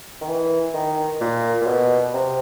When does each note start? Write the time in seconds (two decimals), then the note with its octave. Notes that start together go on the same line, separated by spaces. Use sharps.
0.21 D#3
0.28 E3
0.74 D#3
1.21 A#2
1.61 A#2
1.67 B2
2.13 C3